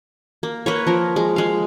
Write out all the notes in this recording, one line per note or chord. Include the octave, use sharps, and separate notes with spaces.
A#3
A#3 B4 C#5
F3 A#4
G#3
G#3 F5